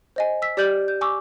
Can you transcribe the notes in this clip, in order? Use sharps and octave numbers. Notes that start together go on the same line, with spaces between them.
C5 D#5 G#5
E6 B6
G4 D5 F6 G6 F#7
G6
G#5 C#6 D6 E6